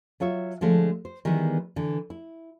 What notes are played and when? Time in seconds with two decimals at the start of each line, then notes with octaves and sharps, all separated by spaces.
0.20 F#3 F4 C#5 E5
0.61 D3 F3 G#3 A3
1.05 C5
1.25 D#3 E3 G3 G#3 B3
1.76 D3 E3
2.10 E4